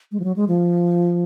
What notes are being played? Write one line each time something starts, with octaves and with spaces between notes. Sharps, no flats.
G#3
F3
F#3
G#3
F3